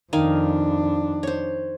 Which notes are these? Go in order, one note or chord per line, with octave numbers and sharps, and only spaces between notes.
F2 D#3 D4 F5 G#5
C5 C#5